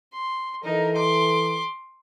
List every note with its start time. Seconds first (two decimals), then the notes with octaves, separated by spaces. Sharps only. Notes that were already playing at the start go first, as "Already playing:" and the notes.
0.12 C6
0.64 E3 D#4 A4 A#4
0.95 C6 D6